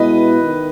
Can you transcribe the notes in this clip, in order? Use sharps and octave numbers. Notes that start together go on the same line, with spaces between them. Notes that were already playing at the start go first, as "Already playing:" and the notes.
Already playing: B2 G#3 B3 E4 B4 D#5
D#3